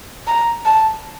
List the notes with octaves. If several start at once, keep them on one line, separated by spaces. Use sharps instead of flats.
A#5
A5